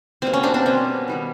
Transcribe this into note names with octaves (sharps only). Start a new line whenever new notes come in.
B2 G3 A#3 C4
C#4
C4 D4
C4 D4
B2 G3 A#3 C#4
D#3 G3 B3